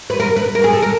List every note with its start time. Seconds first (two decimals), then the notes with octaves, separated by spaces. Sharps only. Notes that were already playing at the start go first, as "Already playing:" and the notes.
0.10 B4
0.20 A#4
0.36 B4
0.55 A#4
0.64 G#4
0.73 A4
0.82 A#4